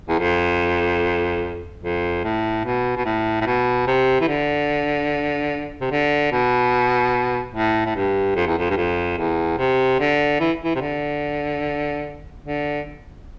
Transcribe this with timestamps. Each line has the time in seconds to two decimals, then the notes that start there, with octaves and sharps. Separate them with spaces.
0.09 E2
0.19 F2
1.83 F2
2.24 A2
2.65 B2
2.97 B2
3.05 A2
3.41 A2
3.46 B2
3.87 C3
4.21 E3
4.28 D3
5.81 C3
5.91 D3
6.32 B2
7.55 A2
7.86 A2
7.96 G2
8.36 F2
8.47 E2
8.58 F2
8.70 G2
8.77 F2
9.17 E2
9.58 C3
10.00 D3
10.40 E3
10.64 E3
10.76 C3
10.81 D3
12.44 D3